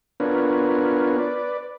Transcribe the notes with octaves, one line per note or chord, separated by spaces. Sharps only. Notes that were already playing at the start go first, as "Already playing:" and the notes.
B3 D4 F4 A#4 B4 C#5
B4 D5